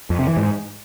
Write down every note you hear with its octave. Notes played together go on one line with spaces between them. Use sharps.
F2
C3
E3
G#2